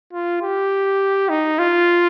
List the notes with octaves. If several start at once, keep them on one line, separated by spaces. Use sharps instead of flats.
F4
G4
D#4
F4